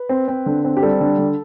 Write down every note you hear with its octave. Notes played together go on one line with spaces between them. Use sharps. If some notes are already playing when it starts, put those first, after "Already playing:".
Already playing: B4
C4
C4
D3
C4
G4
G3 A4
D3
D3